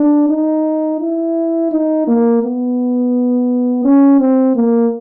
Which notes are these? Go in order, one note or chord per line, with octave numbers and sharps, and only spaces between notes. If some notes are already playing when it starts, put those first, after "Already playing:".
Already playing: D4
D#4
E4
D#4
A#3
B3
C#4
C4
A#3